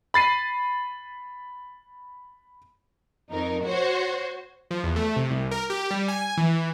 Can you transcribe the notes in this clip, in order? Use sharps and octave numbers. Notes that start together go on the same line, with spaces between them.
B5 A6 C7 D#7
F2 D#4 A#4
F#4 C5 C#5
F3
E2
A3
C3
C2
A#4
G4
G3
G#5
E3